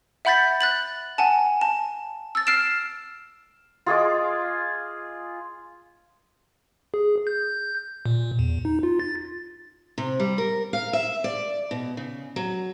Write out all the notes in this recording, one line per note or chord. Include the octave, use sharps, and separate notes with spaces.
E5 F#5 B5 G6 A6 B6
F#6 A6 F#7
F#5 G#5 A5
A5
E6 A6
F6 C7 D7 E7
F4 G#4 D#5 D6
G#4
G6
A#2
E2
D#4
F4
A6
C3
G3
A#4
F5
E5
D5
B2
C#3
F#3